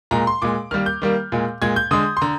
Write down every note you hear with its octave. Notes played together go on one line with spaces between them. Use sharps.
A#2 G#3 A#5
C6
A#2 G#3 D6
D#3 G3 A#3 F6
G6
D#3 G3 A#3
A#2 G#3
A#2 G#3 G#6
G6
D3 G#3 D#6
C6
D3 A#5